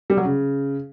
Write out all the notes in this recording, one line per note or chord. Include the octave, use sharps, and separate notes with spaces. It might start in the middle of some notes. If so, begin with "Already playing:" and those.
G3
F#3
C#3